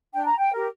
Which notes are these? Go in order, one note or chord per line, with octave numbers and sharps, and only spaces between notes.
D4 G5
A#5
G5
G4 A#4